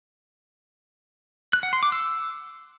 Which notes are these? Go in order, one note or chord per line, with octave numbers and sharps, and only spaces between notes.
F#6
F#5
C6
D6
E6